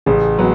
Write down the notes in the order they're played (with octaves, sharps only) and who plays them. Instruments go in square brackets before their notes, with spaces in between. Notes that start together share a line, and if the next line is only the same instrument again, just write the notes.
[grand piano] A1 [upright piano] C#3
[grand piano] F#3 [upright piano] G#3 B3